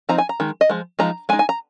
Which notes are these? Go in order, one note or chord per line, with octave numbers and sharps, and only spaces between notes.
F3 C4 D#4 A#5
G#5
A#5
D#3 G#3
D#5
F3 G#3
F3 G#3 D#4 A#5
G#3 D#4 G#5
G#5
A#5